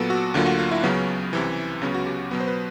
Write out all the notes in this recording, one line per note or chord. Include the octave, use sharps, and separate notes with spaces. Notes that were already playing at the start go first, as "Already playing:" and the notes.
Already playing: A#2 F#3 B3 A4
F#4
D2 D3 F#3 A#3 F4
F#4
F4
E4
C#2 C#3 F#3 B3 C#4
C2 C3 E3
C#2 C#3 F#3 B3 C#4
F#4
G4
B2 F#3 B3
C5
B4